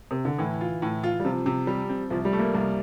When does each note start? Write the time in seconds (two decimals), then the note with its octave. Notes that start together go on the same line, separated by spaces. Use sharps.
0.11 C3
0.25 D3
0.38 A2 E3
0.61 F4
0.82 A2
1.03 F4
1.20 G3
1.25 C3 F3
1.46 C3
1.67 G3
1.89 C4
2.10 C2 F3
2.25 G3
2.33 A3
2.39 A#3
2.54 C2 A#3